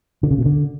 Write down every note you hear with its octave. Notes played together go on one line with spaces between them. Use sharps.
D3
C#3
B2
D3